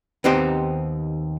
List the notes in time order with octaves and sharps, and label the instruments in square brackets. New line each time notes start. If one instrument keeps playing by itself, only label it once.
[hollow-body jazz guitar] D#2 B3 C4 D#4 G4 C5